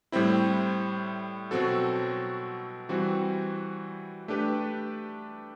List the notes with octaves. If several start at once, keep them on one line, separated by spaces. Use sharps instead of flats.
A2 G3 C4 E4
B2 F#3 C4 F#4 A4
E3 G3 C4 F#4
A3 D4 G4 B4